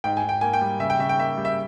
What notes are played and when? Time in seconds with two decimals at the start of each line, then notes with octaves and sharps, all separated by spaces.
0.04 G#2 G5
0.17 G#5
0.23 G#2
0.29 G5
0.41 A#3 G#5
0.53 G5
0.61 G3
0.80 C#3 E5
0.90 G5
0.99 C#3 E5
1.09 G5
1.18 A#3 E5
1.37 G3
1.45 E5